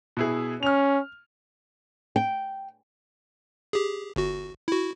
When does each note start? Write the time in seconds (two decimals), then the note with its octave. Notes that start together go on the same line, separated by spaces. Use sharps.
0.17 B2 E4 G#4
0.63 C#4 F6 F7
2.16 G5
3.73 G4 G#4
4.16 G1 F#4
4.68 E4 F#4